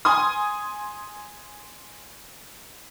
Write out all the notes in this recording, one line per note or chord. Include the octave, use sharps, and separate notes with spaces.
G#5 C6 D#6